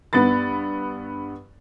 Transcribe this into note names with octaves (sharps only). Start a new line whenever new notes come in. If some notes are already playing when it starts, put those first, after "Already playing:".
G2 B3 B4 B5 A6